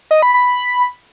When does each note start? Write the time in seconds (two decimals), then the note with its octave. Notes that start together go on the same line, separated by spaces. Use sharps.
0.11 D#5
0.22 B5
0.34 B5